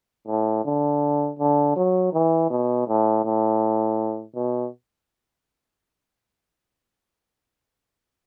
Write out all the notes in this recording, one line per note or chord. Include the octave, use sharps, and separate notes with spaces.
A2
D3
D3
F#3
E3
B2
A2
A2
B2